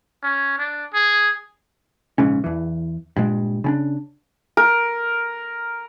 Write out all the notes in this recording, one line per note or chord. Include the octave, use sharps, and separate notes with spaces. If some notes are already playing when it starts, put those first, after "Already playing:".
C#4
D4
G#4
A#1 G#2 C#3 C#4
E2 E3
G2 A#2 G#3
C#3 C#4 D4
A#4